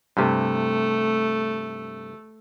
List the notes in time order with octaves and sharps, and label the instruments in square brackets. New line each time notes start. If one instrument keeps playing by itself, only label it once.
[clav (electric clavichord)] G2 C3 [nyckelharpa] A3